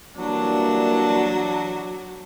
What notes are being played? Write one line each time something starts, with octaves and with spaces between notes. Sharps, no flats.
E3 F#3 G3 A#3 D4 A5